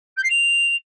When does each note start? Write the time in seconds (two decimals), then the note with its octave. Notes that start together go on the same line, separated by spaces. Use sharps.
0.17 G6
0.23 C7
0.30 F7